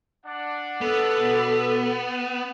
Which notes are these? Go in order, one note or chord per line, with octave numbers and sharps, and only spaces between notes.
D4 F#5
B3 A4
B2